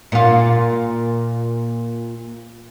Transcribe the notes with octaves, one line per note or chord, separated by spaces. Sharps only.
A#2 F4